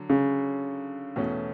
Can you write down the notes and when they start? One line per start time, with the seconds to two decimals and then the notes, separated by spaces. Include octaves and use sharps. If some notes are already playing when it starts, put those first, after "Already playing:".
Already playing: D3 F#3
0.10 C#3
1.16 E2 B2 A3 C#4